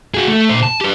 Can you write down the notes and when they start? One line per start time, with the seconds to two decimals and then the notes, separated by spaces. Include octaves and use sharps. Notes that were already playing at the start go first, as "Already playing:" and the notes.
0.14 F#4 G#4
0.28 A3
0.49 A#2 C5
0.63 A5
0.81 G4 B4